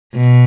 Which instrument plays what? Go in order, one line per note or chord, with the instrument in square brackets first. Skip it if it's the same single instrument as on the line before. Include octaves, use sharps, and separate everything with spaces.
[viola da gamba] B2